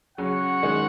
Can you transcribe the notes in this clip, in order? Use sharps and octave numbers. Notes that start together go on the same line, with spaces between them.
C#3 F#3 F#4 C#5 F#5
D#3 G#3